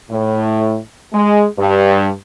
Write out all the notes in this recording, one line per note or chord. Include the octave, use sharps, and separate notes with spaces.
A2
G#3
G2